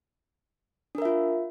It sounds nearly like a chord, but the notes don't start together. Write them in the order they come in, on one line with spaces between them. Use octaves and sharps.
D4 A#4 E5 F4